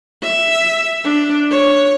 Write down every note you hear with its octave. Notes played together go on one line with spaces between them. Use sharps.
E5
D4
C#5